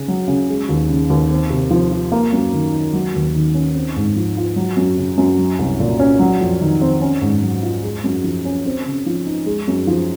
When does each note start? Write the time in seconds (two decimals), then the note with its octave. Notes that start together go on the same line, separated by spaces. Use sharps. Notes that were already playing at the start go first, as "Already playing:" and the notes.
Already playing: C#3 C#4
0.08 F#3
0.28 C#3
0.49 G#3
0.69 D#2
0.89 C#3
1.10 D#2
1.30 C4
1.50 C3
1.70 F3
1.91 F4
2.12 A#3
2.32 F#2
2.53 D#3
2.72 D#4
2.93 F#3
3.14 D#2
3.34 D#3
3.54 C#4
3.75 C4
3.96 G#2
4.16 F3
4.37 F4
4.56 F#3
4.77 F#2
4.97 C#3
5.17 F#2
5.39 F#3
5.59 C2
5.80 A#2
5.99 C#4
6.19 F#3
6.41 F2
6.61 D#3
6.81 C4
7.01 C#4
7.22 G#2
7.42 F#3
7.63 F4
7.83 G#3
8.04 F#2
8.24 F3
8.45 C#4
8.66 C4
8.86 C#3
9.06 F3
9.26 D#4
9.46 G#3
9.67 F#2
9.87 F3